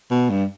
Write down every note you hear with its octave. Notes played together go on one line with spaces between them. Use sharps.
B2
G2